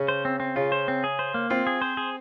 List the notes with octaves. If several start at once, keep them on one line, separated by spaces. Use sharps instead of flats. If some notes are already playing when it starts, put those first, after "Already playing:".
Already playing: C#3 C#4
C5
C4
C4
C#3 C#4 F4
C5
C4
G#4
C5
A#3
C4 F4
G#4
C5
G#4